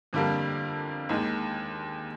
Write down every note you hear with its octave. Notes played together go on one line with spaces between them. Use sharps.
F2 D3 G3 A#3 D4
D#2 D#3 G#3